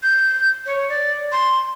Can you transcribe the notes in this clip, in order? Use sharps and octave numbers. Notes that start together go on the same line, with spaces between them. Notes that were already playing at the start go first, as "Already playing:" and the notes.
G6
C#5
D5
C6